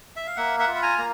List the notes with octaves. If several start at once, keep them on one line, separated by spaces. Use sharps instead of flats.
E5
F5
A#3 E5 F#5
E5 F#5
F4
B5
G#5 A#5
A#3 A#5